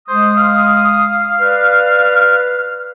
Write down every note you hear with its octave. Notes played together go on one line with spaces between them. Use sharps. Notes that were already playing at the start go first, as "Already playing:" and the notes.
G#3 C5 D#6
F5
B4 D5 F6